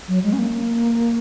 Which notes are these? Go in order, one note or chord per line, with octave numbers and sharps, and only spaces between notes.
F#3
G#3
C#4
A#3